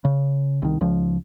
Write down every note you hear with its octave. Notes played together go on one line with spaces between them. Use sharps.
C#3
C2 D#3
C#2 F3